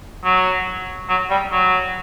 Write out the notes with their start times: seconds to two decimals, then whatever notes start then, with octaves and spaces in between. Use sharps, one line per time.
0.25 F#3
1.09 F#3
1.30 G3
1.52 F#3